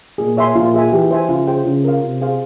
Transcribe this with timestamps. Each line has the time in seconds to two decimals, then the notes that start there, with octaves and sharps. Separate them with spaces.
0.18 A#2 G#4
0.37 C#5 E5 G#5 C6
0.56 A#2 F4
0.74 G#4 E5 G#5
0.92 E3 G4
1.11 C5 E5 G#5
1.29 C#3 F4
1.47 G#4 C5 G5
1.66 C#3 F4
1.84 A#4 F5
2.03 C3 F4
2.21 G#4 C5 F5